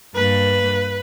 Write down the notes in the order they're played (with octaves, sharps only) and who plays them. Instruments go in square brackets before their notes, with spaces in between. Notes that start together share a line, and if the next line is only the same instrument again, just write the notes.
[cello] G2 A#3 [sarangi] B4